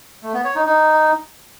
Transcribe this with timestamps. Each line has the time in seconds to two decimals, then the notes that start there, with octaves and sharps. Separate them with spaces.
0.23 A3
0.34 B3
0.45 C#5
0.55 D#4
0.66 D#4